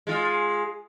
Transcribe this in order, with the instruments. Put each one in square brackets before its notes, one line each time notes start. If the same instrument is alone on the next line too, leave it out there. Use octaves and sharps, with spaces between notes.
[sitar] G#3 F4